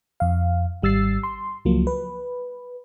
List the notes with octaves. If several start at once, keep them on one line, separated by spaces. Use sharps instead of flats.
F2 F5
G#1 G3 E6 A6 C7
C6
C#2 F3 F#3 A#3
B4